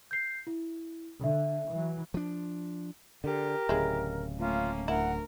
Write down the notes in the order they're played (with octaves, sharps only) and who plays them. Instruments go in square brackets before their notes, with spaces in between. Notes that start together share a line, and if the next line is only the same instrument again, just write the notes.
[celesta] G6 C7
E4
[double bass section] D3 [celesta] E5
[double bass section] E3 F#3
[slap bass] F3 D4
[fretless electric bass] D3 [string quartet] G4 [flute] A#4
[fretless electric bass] D1 C#3 [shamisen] G#3 E4
[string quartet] A3 A#3 C#4 [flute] F4
[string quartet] D2 A#4 [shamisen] E4 [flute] F#5